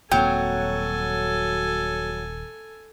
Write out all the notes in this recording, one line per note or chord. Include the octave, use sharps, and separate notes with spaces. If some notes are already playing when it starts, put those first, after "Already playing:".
D#1 F#3 A#3 C4 A4 G5 G#5